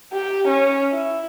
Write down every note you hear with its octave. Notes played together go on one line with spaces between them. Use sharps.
G4
C#4
E4